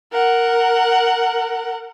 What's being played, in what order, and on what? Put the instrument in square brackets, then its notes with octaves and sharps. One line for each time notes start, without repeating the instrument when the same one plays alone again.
[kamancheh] A#4 F#5